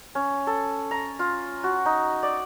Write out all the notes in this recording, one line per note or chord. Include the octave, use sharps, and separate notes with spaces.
C#4
A4
A#5
F4
F#4
D#4
D5